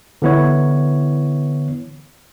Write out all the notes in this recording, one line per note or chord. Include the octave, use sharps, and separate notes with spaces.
D3 E3 B3 E4 C#5